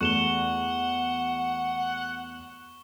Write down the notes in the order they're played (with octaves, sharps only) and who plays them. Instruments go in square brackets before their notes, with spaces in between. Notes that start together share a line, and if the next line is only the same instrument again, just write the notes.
[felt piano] E2 A3 [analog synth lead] F#5 [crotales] C#6 E7 G7